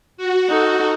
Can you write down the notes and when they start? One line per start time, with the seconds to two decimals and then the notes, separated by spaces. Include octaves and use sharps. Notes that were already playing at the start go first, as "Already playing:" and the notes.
0.17 F#4
0.49 D#4 A4